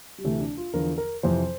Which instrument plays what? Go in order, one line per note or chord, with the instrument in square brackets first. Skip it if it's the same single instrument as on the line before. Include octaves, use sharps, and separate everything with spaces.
[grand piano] G3
D2 C3 E3 A3
D4
F4
E2 D3 F3 A#4
A#4
F2 C3 E3 C5